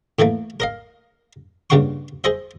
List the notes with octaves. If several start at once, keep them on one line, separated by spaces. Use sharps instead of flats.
A2 E3 A3 A#3
A#4 D#5 F5
G2 A#2 C#3 F#5 C6 C#6
G#4 C5 D#5 E5